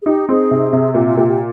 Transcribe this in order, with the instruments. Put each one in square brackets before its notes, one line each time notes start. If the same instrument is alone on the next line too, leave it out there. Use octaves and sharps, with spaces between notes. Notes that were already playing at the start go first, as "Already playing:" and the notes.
[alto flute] G#4
[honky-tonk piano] D#4 [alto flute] G4
[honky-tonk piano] C4 [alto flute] G#4
[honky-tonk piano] C3
C3
[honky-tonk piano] A#2 [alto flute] G4
[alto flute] F4
[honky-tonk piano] A#2 [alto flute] G4
[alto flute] G4